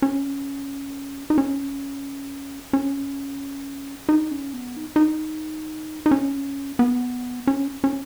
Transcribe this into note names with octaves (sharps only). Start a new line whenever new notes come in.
C#4
D#4
C#4
C#4
D#4
C#4
B3
D#4
D#4
D#4
C#4
B3
C#4
C#4